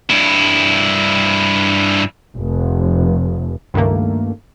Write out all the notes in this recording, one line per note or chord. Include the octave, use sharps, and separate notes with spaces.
G2 E4
F1
C#2 G2 D#3 A3 A#3